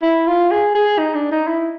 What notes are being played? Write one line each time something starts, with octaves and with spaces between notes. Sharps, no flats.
E4
F4
G#4
G#4
D#4
D4
D#4
E4